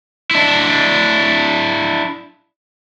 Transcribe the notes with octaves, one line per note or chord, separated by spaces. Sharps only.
D4 E4